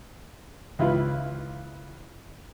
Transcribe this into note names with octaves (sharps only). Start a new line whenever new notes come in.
C#2 E4 F4 B4